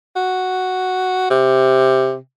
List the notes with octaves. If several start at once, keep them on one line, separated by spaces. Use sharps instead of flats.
F#4
C3